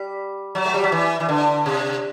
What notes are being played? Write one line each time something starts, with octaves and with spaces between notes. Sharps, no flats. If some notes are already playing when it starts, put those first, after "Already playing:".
Already playing: G3
F#3
A3
G3
F#3
E3
E3
D3
C3